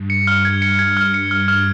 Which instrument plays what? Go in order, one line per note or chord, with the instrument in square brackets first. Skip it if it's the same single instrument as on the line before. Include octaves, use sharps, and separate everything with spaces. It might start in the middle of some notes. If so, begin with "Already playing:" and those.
Already playing: [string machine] G2
[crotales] C#7
F6
G#6
C#7
G#6
F6
C#7
[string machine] G2 [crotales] F6
[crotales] F6